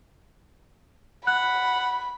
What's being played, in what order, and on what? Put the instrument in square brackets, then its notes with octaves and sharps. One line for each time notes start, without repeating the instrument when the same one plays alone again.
[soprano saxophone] F#5 [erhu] B5 [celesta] F#6